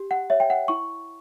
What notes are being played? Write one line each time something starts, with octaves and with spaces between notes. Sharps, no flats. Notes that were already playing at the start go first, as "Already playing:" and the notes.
Already playing: G4
F#5
C#5 E5
G5
F#5
E4 C#6